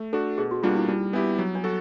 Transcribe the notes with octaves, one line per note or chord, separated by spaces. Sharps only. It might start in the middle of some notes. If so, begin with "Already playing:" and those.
Already playing: A3
D4 F#4 A4
B2 G#4
F#4
G3 A#3 D4 F4 F#4
E4
G3 D#4
B3 D4 E4 G4
F#3 D4
D4
F#4 A4